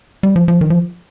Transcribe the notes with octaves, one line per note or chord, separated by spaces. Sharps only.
G3
F3
F3
D#3
F3